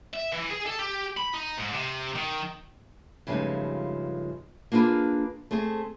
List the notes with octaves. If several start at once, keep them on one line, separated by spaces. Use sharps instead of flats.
E5
E3
G#4
A4
G4
B5
D#4
G#2
C3
D#3
G2 C#3 F3 G#3 A3 D#4
A#3 D4 F4 G#4 B4
A3 C4 G#4 C5